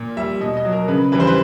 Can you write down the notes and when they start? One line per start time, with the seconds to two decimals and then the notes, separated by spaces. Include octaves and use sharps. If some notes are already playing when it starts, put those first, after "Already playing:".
Already playing: A#2
0.17 G3 E5
0.41 B2 D#5
0.57 D#5
0.65 F#3
0.72 A#4
0.88 C#3 B4
1.12 E3 G3 B4
1.20 C5
1.27 B4